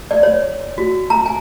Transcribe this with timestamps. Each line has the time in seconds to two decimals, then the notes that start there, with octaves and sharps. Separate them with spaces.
0.11 D5
0.23 C#5
0.78 F#4
1.10 A#5
1.26 G#5